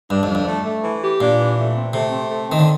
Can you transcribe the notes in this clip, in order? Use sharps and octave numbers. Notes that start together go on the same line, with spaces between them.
G2 D4
F2
D4
F2
A3
A3
E3
G4
A#2 D4
E3
A3
C4
C3 A3
C4
A3
D#3 C4
D3